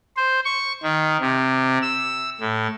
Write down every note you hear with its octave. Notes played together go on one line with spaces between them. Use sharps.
C5
C#6
D#3
C3
E6
A2